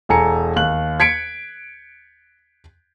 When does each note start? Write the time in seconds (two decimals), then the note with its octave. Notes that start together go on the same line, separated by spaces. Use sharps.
0.09 E1 A4 G#5 A#5 C#7
0.56 D#2 F#6 F#7
1.00 G#6 B6 C#7 D7